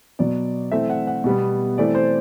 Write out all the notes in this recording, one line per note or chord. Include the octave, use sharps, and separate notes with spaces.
B2 F#3 B3 D5
E3 A3 C4 E5
F#5
F#5
B2 G3 B3
E3 A3 C4 D5
C5